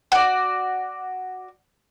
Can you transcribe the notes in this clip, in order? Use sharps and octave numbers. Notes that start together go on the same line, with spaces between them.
F#4 D5